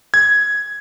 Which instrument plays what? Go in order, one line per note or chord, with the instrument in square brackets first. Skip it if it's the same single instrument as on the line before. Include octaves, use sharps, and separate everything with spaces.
[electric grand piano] G#6